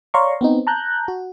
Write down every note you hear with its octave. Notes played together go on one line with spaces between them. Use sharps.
C#5 D5 F5 A#5 C6 C#6
B3 C4 D#4
A5 A#5 F#6 G6
F#4